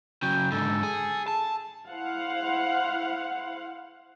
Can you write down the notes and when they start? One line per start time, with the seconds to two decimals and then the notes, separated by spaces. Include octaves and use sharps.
0.22 C#3 F#3 G5
0.52 G#2 D3 A4
0.83 G#4
1.28 A5
1.88 E4 C5 F5 F#5